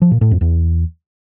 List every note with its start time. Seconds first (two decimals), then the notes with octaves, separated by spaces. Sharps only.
0.02 F3
0.11 A#2
0.21 A2
0.31 F2
0.41 E2